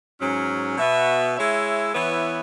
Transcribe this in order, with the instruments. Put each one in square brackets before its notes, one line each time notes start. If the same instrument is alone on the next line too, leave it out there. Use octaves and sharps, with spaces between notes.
[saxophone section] G#2 F#3 C#4
B2 B3 F#4 E5
G#3 E4 C#5 E5
E3 B3 E4 C#5 E5